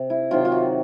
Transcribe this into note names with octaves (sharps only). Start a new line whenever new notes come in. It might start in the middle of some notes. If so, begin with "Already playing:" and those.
Already playing: C3
E4
C3 D#3 F#3 F4
F4
F#4